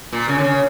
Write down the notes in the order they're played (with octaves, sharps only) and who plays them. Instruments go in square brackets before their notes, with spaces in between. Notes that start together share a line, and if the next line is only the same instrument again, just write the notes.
[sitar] A#2
C#3
D3
C#3